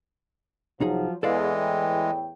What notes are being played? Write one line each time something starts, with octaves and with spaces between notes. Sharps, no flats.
C2 F3 F#3 D#4 G#4
E2 E3 G#3 A4 D5 F5
E2 A2 G5